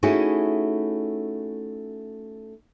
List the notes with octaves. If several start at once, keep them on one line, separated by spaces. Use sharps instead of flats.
A3 C#4 D#4 E4 F#4 G#4